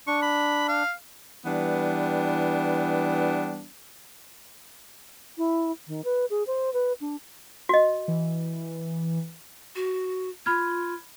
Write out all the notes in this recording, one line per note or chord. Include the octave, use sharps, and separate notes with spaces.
D4 C#6
B5
F5
E3 G3 B3 D4
E4
D#3
B4
G#4
C5
B4
D4
F#4 D#5
E3
F#4
F4 B5 F6 G#6